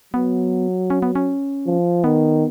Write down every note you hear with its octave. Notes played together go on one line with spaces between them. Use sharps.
F#3 B3
C#4
B3
C#4
F3
D#3 B3